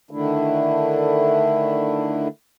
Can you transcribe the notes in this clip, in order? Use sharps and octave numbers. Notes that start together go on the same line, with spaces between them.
D3 D#3 A3 D4 E4